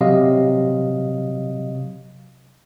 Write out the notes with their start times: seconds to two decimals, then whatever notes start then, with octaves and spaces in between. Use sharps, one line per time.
0.01 C3 F#3 D#5 F5